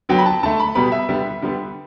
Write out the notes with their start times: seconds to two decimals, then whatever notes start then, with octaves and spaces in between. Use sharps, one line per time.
0.09 D3 F#3 B3 G5
0.18 B5
0.26 A5
0.43 D3 A3 A5
0.60 B5
0.75 B2 G3 B3 B5
0.92 E5
1.09 D3 G3 B3
1.42 D3 G3 B3